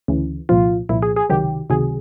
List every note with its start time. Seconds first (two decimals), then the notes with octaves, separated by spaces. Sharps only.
0.08 D2 C#3 E3
0.49 C2 A#2 F3 F4
0.89 C2 A#2 F3 E4
1.02 G#4
1.16 G#4
1.29 C#2 C3 D#3 F#3 G4
1.70 C#2 C3 D#3 F#3 G#4